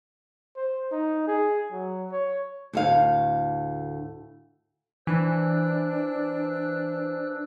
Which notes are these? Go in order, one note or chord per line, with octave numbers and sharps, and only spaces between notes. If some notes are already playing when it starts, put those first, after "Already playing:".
C5
D#4
G#4
F#3
C#5
D2 A2 F5
E3 D4 C5 E6 F#6